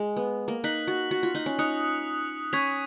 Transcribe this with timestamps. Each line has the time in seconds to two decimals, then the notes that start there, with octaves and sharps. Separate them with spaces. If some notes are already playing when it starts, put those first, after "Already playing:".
Already playing: G#3
0.16 B3
0.48 A#3
0.64 D#4 F#6 B6 F#7
0.88 F#4
1.11 F#4
1.23 F4
1.35 D#4
1.46 C#4
1.58 D#4 D#6 F#6 C#7 F7
2.53 C#4 C#6 G#6 B6 F7